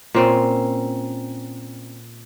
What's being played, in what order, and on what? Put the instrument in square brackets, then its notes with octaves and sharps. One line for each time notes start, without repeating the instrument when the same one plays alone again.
[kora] A#2 C4 C#4